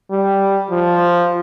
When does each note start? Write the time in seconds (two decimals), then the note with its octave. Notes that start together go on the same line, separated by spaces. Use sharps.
0.11 G3
0.71 F3